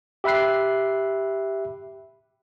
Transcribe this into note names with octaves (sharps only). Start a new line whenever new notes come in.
G4 E5 B5 F#6 C7